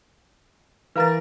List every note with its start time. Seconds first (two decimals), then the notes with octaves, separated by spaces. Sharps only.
0.96 E3 A#4 B4 F5 A#5 A6